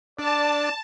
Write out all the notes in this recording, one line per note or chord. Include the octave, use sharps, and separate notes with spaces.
D4 D5 A5